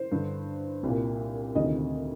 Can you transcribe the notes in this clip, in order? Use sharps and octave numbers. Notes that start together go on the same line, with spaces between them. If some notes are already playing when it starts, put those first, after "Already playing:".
Already playing: C5
G2 D3
C2 A#2
D2 C3 D#3 D#5